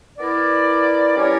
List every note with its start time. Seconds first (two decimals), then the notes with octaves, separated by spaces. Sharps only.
0.18 B3 E4 A#4 D5
1.16 G3 C#4 E4 A#4 C#5